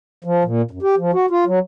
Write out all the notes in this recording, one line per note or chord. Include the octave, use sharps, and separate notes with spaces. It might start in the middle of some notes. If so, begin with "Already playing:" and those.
F3
A#2
F#2
G4
F3
F#4
F4
F#3